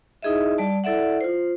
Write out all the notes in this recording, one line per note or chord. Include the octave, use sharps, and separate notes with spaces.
D#4 E4 G#4 D#5 E5
G3 D5 A5
E4 A4 D5 E5 F#5
F4 C5